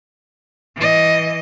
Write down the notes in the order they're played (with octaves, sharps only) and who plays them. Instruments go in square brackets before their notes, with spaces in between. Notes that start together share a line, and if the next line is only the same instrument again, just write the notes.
[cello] E3 D#5